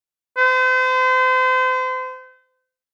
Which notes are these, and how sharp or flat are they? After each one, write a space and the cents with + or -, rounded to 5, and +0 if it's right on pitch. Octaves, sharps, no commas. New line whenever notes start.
C5 -35